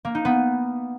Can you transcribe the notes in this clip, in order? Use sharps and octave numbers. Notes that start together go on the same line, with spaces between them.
A#3
D#4
B3